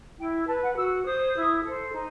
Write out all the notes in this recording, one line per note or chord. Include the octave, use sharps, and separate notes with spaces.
E4 G5
B4 A5
F#5
F#4 E6
C5 D#6
E4
A4 C5
D#4